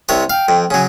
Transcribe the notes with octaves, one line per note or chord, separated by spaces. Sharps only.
C2 C3 C#5
F5 G5
F2
C#3 F#3 G#5